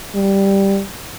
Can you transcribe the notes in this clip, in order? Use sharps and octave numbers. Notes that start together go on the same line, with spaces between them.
G3